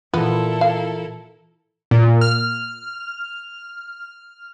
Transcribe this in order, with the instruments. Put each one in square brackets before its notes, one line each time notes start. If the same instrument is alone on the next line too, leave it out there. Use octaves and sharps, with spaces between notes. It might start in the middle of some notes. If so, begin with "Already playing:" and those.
[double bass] A#2 [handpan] E3 F4 [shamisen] B3 [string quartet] E4 A4 A#4
[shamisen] F5
[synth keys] A#2
F6